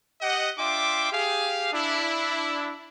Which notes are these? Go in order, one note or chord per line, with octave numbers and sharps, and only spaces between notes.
G4 D#5 F#5
D4 F4 E5 G5 C6 D6
G4 G#4 F5
D4 E4